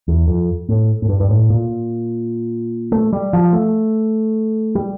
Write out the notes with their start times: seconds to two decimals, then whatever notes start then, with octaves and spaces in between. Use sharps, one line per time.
0.08 E2
0.28 F2
0.69 A2
1.02 A2
1.09 G2
1.20 G2
1.29 A2
1.50 A#2
2.92 A3
3.13 G3
3.33 F3
3.53 A3
4.75 G3